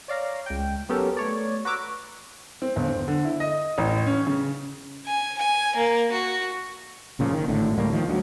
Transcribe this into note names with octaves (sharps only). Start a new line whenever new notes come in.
C#5 D5 F5 A#5
C#2 G5
F#3 B3 C#4 G4 A4 A#4
A3 C#5 D5
F#4 B4 A#5 D6 E6
C4
G1
C4
D3
E4
D#5
A1
C#4
C#3
G#5
G#5
A#3
F#4
F#1 A#2 C#3 F3
D#3
G#1 A2 D3
D1 A2 G3 A#3
D#3 F3
D2 F#3